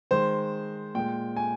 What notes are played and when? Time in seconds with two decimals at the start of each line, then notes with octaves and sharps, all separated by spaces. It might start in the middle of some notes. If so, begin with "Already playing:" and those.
0.11 D#3 G#3 C5
0.95 A#2 G#3 G5
1.36 G#5